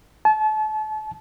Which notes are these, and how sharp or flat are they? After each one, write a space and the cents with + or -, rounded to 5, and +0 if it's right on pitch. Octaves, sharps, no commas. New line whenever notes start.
A5 -35